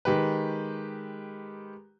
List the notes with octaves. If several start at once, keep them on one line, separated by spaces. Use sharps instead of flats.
D#3 G#3 G4 B4